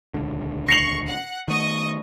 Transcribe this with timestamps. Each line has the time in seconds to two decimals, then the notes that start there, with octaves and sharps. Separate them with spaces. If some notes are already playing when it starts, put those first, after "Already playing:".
0.14 D#1 C#2 D3
0.68 C#6 A#6 C7 C#7 F7 F#7
1.07 F#5
1.48 D#3 A3 D#5 C#6 D#6